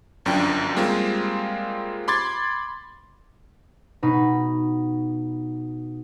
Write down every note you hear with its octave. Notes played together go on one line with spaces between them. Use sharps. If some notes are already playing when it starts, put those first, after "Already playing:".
G1 F#2 F3 D4 G5
G3 G#3 A#3 C4 F4
B5 C6 D6 G#6 A6
B2 D#4 B5